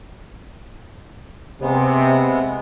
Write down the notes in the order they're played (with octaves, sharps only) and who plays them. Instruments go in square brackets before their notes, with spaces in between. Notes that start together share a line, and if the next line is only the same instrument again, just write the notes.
[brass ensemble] C3 [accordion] G#3 B3